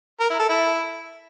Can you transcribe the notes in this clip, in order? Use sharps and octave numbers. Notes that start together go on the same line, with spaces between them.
A#4
E4
A4
E4